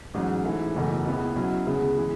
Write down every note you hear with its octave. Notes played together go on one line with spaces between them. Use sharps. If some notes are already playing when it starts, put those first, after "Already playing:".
A1 G#2 F#3 C#4
G#2 E3 A3 E4
F#1 E2 B2 A3
C#2 C#3 G#3 B3 E4
B2 F#3 C#4 E4
D2 C#3 G#3 B3
E3 G#3